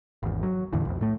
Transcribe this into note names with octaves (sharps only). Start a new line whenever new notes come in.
G#1 E2
F#3
E2 A2 D3 E3
B1 F2
A2 A3